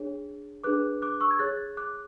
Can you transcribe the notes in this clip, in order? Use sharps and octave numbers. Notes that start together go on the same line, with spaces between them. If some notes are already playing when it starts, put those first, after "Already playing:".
Already playing: D4 G#4 C#5
D4 G#4 B4 D6 F#6
D6 F#6
C#6 E6
G#6
G#4 C#5 F#6 A6
D6 F#6